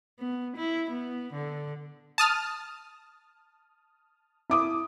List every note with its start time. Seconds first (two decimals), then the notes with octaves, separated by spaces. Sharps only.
0.19 B3
0.56 E4
0.90 B3
1.33 D3
2.18 A5 D#6 F6
4.50 E4 D6 D#6